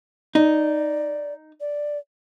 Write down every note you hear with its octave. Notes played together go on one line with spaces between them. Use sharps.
D#4 D5
D5